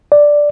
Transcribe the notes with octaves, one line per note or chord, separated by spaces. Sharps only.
D5